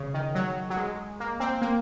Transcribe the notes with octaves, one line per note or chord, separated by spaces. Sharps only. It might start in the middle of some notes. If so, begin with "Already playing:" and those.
Already playing: C#3
D#3
F#3
F#3
G#3
A#3
C4
A#3